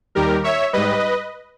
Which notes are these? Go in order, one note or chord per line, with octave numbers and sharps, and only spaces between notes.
D#2 D#3 G3 G4 A#4
C#5 E5
G#2 G3 B4 D#5